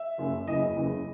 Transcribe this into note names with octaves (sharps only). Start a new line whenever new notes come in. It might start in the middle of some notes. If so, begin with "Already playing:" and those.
Already playing: E5
F#1 F#2 C#3
F#1 E2 C#3 E3 D#5
F#1 E2 C#3 E3